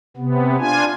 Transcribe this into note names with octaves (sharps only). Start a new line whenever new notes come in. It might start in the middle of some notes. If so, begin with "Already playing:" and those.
C3 B3
D4 F4 G#5